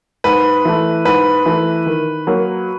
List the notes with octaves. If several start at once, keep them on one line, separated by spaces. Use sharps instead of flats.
G#2 B4
E3 A3
G#2 B4
E3 A3
D#3
F#3 A#3